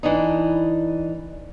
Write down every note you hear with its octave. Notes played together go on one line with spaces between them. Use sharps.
E3 D4 D#4